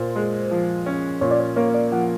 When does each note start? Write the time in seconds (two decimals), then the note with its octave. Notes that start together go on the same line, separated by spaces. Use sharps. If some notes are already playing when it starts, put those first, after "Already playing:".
Already playing: A#2 C5
0.16 G#3
0.51 F3
0.86 C#4
1.21 A#2 C#5
1.31 D5
1.40 C#5
1.56 A#3 C#5
1.74 D5
1.92 F3 F#5